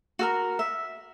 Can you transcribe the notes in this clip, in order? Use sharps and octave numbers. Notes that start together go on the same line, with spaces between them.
F#4 A4 A#4
E5